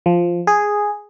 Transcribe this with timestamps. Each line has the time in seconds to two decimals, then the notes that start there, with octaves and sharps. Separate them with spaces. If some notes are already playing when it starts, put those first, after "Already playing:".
0.06 F3
0.47 G#4